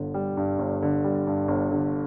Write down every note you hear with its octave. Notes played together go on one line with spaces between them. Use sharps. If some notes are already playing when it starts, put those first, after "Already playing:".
Already playing: G1 G2 D3
G3
G2
G1
D3
G3
G2
G1
D3